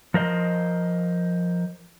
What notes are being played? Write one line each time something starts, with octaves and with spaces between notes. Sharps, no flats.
F3 A#4 C5 D#5